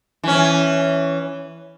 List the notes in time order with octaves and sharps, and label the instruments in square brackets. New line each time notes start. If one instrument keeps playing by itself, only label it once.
[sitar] E3 C#4